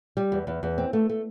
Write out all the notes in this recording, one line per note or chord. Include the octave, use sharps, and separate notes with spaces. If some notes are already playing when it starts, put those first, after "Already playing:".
G3
E2
E2
E2
C4
A3
A3